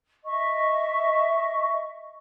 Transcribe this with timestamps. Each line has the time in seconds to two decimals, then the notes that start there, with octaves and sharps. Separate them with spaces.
0.25 D#5 E5 C#6